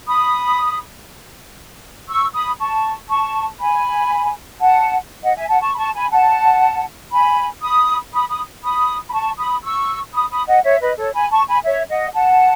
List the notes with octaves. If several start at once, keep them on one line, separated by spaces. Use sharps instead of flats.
B5 D#6
C#6 E6
B5 D#6
A5 C#6
A5 C#6
G#5 B5
F#5 A5
D#5 F#5
E5 G#5
F#5 A5
A5 C#6
B5
A5 C#6
G#5 B5
F#5 A5
G#5 B5
B5 D#6
B5 D#6
B5 D#6
B5 D#6
B5
A5 C#6
B5 D#6
C#6 E6
B5 D#6
B5 D#6
D#5 F#5
C#5 E5
B4 D#5
A4 C#5
G#5 B5
A5 C#6
G#5 B5
C#5 E5
D#5 F#5
F#5 A5